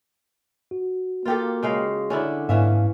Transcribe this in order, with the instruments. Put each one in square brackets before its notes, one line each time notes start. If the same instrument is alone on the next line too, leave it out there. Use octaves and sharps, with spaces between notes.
[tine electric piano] F#4
[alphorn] A#3 [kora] F4 G4 A4
[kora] C#3 G#3 F5
[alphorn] D3 [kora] C#4 D4 E4
[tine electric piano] G#2 B3 F5 [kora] E3 C#4 E5